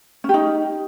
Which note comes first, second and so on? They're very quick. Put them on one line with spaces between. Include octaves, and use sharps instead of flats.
C#4 G4 D#4